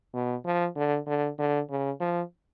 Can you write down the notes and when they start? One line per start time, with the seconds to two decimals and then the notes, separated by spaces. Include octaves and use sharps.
0.14 B2
0.45 F3
0.76 D3
1.07 D3
1.38 D3
1.69 C#3
2.00 F3